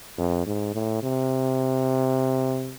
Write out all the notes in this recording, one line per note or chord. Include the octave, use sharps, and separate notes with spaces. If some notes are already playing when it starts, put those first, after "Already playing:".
F2
G#2
A2
C3